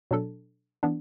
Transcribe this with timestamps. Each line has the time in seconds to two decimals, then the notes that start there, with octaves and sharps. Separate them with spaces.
0.11 B2 F#3 D4 A4
0.83 E3 B3 D4